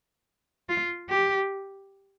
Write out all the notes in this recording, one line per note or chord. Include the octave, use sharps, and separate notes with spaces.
F4
G4